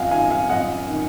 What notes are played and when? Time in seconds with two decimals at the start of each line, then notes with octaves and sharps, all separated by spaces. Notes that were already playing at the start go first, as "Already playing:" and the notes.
Already playing: F#2 D#5 F5 F#5 G#5
0.11 D#3 F5 G#5
0.30 F5 G#5
0.49 F#2 D#5 F#5
0.88 D#3